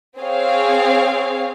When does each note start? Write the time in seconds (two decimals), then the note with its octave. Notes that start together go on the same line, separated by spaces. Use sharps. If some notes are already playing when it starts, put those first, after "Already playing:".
0.18 C4 G#4 C#5 F5